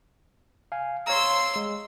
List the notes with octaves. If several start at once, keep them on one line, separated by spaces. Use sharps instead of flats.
F5 G#5
C#5 F5 A#5 C6 E6
G#3